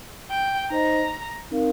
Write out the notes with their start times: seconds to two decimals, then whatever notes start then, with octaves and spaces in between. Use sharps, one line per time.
0.30 G5
0.70 D#4 C5 D#5 A#5
1.51 C4 D#4 A#4 F5